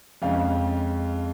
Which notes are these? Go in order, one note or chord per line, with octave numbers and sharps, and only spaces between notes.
F2 C#3 G#3 F5